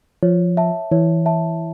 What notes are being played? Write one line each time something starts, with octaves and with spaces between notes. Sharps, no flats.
F3 C#5
E5 A5
E3 C#5
E5 A5